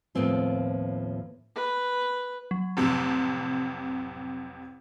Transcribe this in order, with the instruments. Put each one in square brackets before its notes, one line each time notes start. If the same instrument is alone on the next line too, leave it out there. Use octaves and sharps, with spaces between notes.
[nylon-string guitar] D#2 A2 F3 B3 C4 F4
[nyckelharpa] B4
[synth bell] F#3
[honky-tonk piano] A1 F2 C3